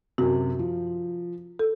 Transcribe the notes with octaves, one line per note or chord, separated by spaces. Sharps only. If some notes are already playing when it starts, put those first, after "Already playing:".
F#2 C3 F#4
F3
A4